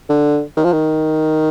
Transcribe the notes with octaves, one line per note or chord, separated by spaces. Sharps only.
D3
D#3
F3
D#3